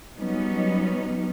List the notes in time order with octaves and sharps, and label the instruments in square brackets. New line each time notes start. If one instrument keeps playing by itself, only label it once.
[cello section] F#3 G3 B3 C#4 D#4